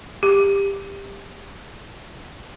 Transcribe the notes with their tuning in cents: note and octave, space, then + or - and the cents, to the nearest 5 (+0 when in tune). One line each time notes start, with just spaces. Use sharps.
G4 +20